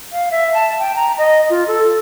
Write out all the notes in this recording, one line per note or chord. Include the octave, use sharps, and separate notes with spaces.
F5
E5
A5
G5
A#5
D#5
F4
A4